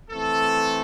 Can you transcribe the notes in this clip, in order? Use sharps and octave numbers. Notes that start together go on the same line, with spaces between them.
E3 A3 C4 A4